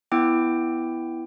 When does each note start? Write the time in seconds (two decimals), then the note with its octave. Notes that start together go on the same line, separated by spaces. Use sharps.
0.12 B3 E4 G5 D6